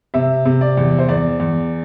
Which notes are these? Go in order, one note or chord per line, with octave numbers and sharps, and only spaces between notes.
C3 E5
C3
D5
E2
C5
E2 D5
E2